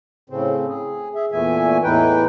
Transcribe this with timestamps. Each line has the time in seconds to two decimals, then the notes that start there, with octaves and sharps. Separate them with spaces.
0.30 A2 C#3 C4
0.69 G#4
1.15 G#4 E5
1.32 E2 A#2 E3 A3 E5 G#5
1.83 E2 A2 E3 D#4 B4 G5